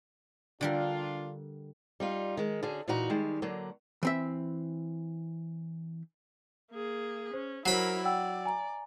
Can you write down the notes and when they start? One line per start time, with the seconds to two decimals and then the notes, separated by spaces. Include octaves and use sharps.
0.61 D3 G3 D4 F4 A#4
2.00 G3 D#4 F4
2.37 D#3 G#3
2.63 D3 C#4 F#4 G#4
2.88 A#2 E3 D#4 F#4 A#5
3.10 D#3 G3 G#3
3.42 D3 F#3 A#3
4.03 E3 C4 E5
6.71 A#3 G#4
7.34 C#4 C5
7.66 F#3 E4 A#4 C5 B5 C7
8.05 D5 F#5 G5 E6
8.45 G#5 A#5